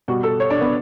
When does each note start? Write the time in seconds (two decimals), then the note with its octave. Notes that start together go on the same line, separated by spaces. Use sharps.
0.08 B2 G3 F#4
0.23 A4
0.40 C#5
0.50 D4
0.61 B3